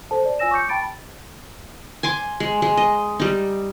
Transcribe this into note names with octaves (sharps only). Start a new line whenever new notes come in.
A4 C5 A5
D5
F4 C#5 G#5 E6 A#6 E7
C#6 D6 G6 C#7
G5 A5 B5 A6 D7
G#5 C6 D6
G#3
G#3
D#5
G3 D#4